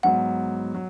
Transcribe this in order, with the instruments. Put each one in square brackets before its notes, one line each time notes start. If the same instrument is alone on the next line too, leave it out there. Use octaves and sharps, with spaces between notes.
[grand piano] G#2 F#3 B3 [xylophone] F#5
[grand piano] F#3